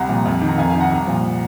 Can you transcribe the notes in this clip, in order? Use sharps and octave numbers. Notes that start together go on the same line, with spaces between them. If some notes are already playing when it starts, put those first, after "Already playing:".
Already playing: C2 F#5 A#5
A#2 F3
F2
D#3
A#5
F2 F5 G#5
F5 G#5
D#3
F#5 A#5
C2
A#2 F3